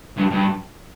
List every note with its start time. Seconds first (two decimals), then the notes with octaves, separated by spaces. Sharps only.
0.17 G2
0.31 G2